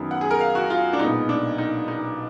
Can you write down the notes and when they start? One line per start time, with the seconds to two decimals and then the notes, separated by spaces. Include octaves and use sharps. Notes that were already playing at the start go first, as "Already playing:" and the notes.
Already playing: F#2 D#3 F#3 B3
0.11 F#5
0.21 G#4
0.31 A#4
0.41 F5
0.55 F#4
0.70 F4
0.93 D4
0.99 B1 A#2 G#3 B3 D#4
1.29 D4
1.58 D#4
1.88 D#4